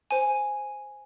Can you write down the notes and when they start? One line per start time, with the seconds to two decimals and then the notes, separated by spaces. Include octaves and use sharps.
0.11 C5 G#5